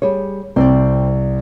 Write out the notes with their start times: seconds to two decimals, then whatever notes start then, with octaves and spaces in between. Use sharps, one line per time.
0.02 G3 G#4 C#5
0.56 C2 C4 C5 D5